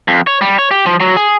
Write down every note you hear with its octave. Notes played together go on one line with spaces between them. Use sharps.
F2
C#5
G3
C#5
G4
F3
F#3
G#4